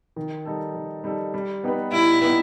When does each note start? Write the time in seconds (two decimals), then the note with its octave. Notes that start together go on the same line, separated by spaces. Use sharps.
0.16 D#3
0.45 G3 D#4 A4
0.74 D#3
1.04 G3 D#4 A4
1.34 G3
1.63 B3 D#4 G4 B4
1.92 G3 E4
2.21 B3 D#4 G4 B4